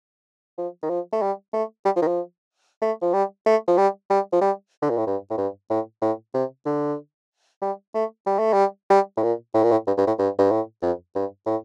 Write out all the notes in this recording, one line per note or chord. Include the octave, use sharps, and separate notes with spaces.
F3
D#3
F3
A3
G3
A3
G3
F3
D#3
F3
A3
F3
G3
A3
F3
G3
G3
F3
G3
D3
A#2
A2
G2
A2
G2
A2
A2
C3
D3
G3
A3
G3
A3
G3
G3
A2
A#2
A2
A#2
A2
G2
G2
A2
G2
G2
A2
F2
G2
A2